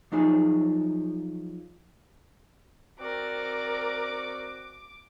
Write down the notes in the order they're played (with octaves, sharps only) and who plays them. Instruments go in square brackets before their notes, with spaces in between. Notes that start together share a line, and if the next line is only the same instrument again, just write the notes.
[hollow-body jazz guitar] F3 F#3 D#4 E4 G#4
[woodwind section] C4 F#4 [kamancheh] A#4 D5 [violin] D6